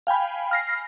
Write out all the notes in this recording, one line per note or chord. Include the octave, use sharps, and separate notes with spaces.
F5 G5 G#5 B5
F6 A#6 C7